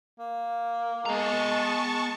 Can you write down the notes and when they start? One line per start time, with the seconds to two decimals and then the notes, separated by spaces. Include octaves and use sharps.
0.19 A#3
1.06 G#3 B3 A5 A#5 C#6